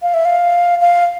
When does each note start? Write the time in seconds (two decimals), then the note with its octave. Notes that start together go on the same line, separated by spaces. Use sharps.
0.02 F5
0.14 E5
0.25 F5
0.81 F5